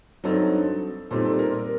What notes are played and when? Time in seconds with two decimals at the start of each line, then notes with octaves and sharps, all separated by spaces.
0.24 G2 F#3 C4 D#4 A4
1.11 A#2 G3 C4 D#4 A4
1.25 A4
1.39 A#4
1.54 A#4